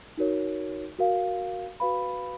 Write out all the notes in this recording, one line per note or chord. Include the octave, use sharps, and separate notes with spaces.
D#4 F#4 A#4 C#5
F#4 A#4 F5
F#4 B4 F5 B5